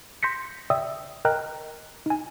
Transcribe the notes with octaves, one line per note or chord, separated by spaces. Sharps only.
C6 G6 A#6 B6 C#7
D5 E5 G5 D#6 E6
A#4 D#5 G5 A#5 F6 F#6
D#4 G#5